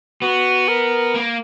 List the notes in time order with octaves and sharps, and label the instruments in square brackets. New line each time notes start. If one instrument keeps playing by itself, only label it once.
[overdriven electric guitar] B3 [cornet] F#4
[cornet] A#4
[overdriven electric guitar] A#3